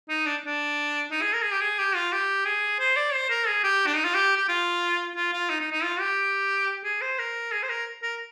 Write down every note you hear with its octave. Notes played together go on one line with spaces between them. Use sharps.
D#4
D4
D4
D#4
G#4
A#4
G#4
G4
G#4
G4
F4
G4
G#4
C5
D5
C5
A#4
G#4
G4
D4
D#4
F4
G4
G4
F4
F4
F4
D#4
D#4
D#4
F4
G4
G#4
C5
A#4
G#4
C5
A#4
A#4